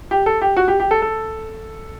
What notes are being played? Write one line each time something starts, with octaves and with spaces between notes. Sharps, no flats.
G4
A4
G4
F#4
G4
G4
A4
A4